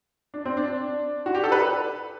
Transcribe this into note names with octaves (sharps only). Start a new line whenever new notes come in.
D4
C4
D4
F#4
G4
A4
B4